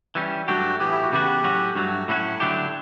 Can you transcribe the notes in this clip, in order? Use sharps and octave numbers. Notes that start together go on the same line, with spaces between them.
E3 G3 C#4
G2 F#3 A3 D4 F#4 G4
A2 E3 B3 G4
E4
F#4
E2 C#3 E3 B3 F#4 G4
A2 F#3 C#4 F#4
G2 F#3 A3 F#4
A2 F#3 C#4 E4 F#4
D3 F#3 A3 D4 G4